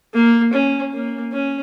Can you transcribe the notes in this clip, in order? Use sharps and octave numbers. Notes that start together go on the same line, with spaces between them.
A#3
C#4
A#3
C#4